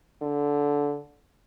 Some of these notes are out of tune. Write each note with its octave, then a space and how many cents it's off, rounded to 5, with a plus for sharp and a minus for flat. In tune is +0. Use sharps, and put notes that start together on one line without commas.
D3 -15